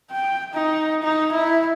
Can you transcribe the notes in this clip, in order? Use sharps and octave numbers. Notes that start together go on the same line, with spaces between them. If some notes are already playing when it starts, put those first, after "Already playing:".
G5
D#4
D#4
E4